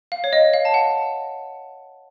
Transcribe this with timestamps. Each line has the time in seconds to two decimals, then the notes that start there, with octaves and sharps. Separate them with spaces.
0.12 F5
0.24 C#5
0.33 D#5
0.54 F5
0.65 A5
0.74 F#5